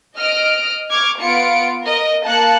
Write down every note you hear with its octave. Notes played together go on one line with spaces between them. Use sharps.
D#5 F6 D7
C#6 D6 F6 G#6
B3 F4 C#7 D7
A#4 D#5
A#3 A5 F#6 C#7